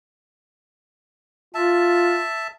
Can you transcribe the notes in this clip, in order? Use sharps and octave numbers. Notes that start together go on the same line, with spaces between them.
F4 E5 A5